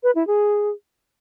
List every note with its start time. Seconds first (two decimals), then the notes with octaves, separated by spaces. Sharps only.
0.03 B4
0.15 E4
0.27 G#4